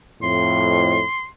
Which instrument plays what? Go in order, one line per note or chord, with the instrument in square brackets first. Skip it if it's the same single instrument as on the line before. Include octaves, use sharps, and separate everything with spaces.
[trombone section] F2 A2 [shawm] C6